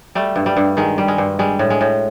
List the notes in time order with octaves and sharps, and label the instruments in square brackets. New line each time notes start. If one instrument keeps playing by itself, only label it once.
[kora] G3 A3
G2
G3
G2
D#3 G#3
G3
G#3
G2
G3 G#3
A2
G#3
A2